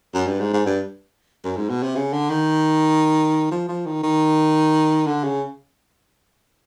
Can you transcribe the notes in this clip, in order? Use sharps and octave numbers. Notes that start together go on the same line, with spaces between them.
F#2
G2
G#2
G#2
G2
F#2
G#2
B2
C3
C#3
D3
D#3
F3
F3
D#3
D#3
D3
C#3